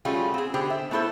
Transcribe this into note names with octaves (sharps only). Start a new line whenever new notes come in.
G3 A3 C#4 F4 F#4 G#4
C4 G#4
D3 B3 G4 G#4 C5
E5
A3 B3 E4 A4 C5